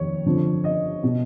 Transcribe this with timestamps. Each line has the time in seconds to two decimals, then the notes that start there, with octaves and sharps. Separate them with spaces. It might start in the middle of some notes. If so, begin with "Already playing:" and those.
Already playing: F1 D#2 D#3 C#5
0.26 G1 F2 D3 F3
0.64 D#5
1.03 B2